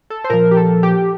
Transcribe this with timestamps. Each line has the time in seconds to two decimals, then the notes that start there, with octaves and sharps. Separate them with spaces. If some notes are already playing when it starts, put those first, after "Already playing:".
0.10 A4
0.24 C5
0.30 A#2 F3 A#4
0.51 G4
0.57 A4
0.83 G4